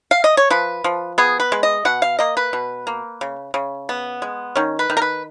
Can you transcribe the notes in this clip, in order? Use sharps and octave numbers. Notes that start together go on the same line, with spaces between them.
F5
D#5
C#5
F3 B4
F3
B3 G#4
B4
G#3
D#5
B2 F#5
F5
A#3 D#5
B4
B2
A#3
C#3
C#3
B3
G#3
D#3 C#4
B4
D#3
A#4
B4